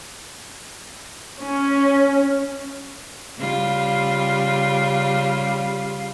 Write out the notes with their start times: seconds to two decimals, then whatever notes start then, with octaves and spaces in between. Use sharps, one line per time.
1.42 C#4
3.38 C#3 G3 F4